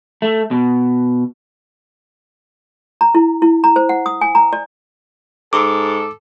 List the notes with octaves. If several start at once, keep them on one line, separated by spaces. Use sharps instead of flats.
A3
B2
A#5
E4
E4
A#5
C5
F#5
D#6
G#5
A#5
D5
G#2 A4 D6